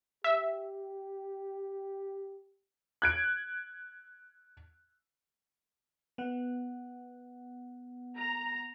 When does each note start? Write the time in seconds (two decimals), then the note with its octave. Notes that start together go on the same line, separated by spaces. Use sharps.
0.24 G4 E5
3.02 F#6 G#6 D7
6.18 B3 F#5
8.18 A#5